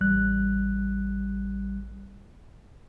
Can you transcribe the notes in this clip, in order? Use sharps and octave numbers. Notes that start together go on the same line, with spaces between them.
A1 G3 F#6